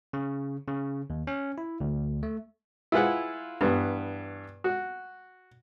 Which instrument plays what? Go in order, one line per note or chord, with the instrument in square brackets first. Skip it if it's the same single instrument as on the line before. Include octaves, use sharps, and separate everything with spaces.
[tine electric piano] C#3
C#3
D#2
C#4
E4
D2
A3
[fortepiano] E4 F4 G#4 B4 F#5
G2 E3 B3
F#4